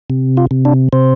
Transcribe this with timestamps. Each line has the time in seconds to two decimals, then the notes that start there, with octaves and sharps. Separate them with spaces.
0.10 C3
0.37 F4
0.51 C3
0.65 D4
0.93 C3 C5